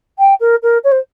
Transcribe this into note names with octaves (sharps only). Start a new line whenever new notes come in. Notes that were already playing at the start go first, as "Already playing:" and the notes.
G5
A#4
A#4
C#5
C5